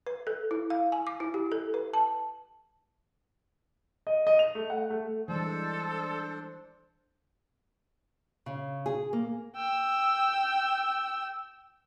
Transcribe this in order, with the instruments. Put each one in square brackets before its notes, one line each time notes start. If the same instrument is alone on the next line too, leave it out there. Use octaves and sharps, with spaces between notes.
[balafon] B4
A4
E4
F5
G#5
D6
E4
G4
A4
B4
A5
[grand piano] D#5
D#5
F7
A3
F#5
A3
[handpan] E3 G3 G#3 [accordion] D4 C5 [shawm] A4
[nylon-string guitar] C#3
G#4
A#3
[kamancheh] G5 E6